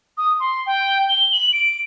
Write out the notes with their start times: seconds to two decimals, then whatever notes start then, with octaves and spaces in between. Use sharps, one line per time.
0.17 D#6
0.40 C6
0.66 G5
1.09 G7
1.32 F#7
1.53 D7